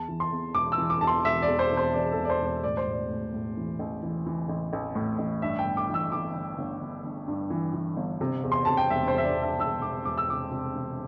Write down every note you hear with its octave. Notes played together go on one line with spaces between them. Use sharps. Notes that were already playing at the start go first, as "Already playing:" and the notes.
Already playing: E2 A5
E3
C6
E2
E1 D6
E6
E3
D6
E1 A5
C6
E1 E5
D5
E2
C5
E1
C5
E2 D5
A4
E1
D5
C5
E1 D5
A2 D5
C5
A2 D5
A2
A2
E3
A1
E3
E3
A1
A1
A2
A1
G2 E5
G5
G1
D6
E3
E6
E3 D6
G1
G1
G1
G1
G2
E3
E3
G1
C3
E2
C6
C3 A5
G5
E1 E5
C5
E1 E5
D5
E1
E5
E1 E6
E1 D6
E1 D6
E6
C3 D6
C3
E1